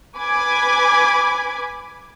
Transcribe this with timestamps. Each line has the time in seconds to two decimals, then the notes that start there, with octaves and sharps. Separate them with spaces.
0.17 B4 G#5 B5 D6 G#6